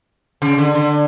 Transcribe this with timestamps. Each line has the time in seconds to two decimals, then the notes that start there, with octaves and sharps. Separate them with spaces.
0.42 C#3
0.58 D3
0.75 D3